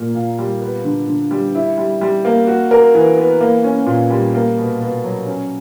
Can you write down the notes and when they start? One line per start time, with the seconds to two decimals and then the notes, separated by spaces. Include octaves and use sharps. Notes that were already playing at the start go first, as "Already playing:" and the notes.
Already playing: A#2 A#3
0.15 A#2
0.38 G3
0.61 B3
0.84 D3
1.07 D3
1.31 G3
1.55 E4
1.77 G3
2.01 G3
2.25 A#3
2.47 F#4
2.71 A#4
2.95 E3
3.17 B3
3.41 A#3
3.64 C#4
3.86 A#2
4.10 G3
4.34 A#3
4.57 B2
4.80 B2
5.04 F#3
5.26 C#4